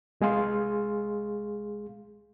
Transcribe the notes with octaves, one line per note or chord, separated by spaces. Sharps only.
C2 G#3 G#4 F5 C6